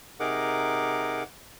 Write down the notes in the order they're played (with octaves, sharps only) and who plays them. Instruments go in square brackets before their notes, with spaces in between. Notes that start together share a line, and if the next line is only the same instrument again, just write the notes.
[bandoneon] C3 D#4 G#4 A#4 F#5 D6